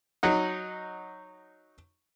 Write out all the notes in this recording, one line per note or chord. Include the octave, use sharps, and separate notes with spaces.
F#3 D#4 F#5